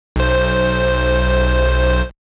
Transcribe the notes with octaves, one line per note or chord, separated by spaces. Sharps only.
B1 C5